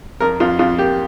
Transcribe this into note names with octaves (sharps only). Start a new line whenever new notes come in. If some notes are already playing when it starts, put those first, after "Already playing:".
F2 A#4
F2 F4
F2 F4
A#3 G4